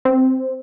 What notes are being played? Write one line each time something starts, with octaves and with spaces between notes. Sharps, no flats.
C4